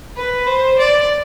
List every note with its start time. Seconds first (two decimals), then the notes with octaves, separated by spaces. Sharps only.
0.17 B4
0.47 C5
0.79 D5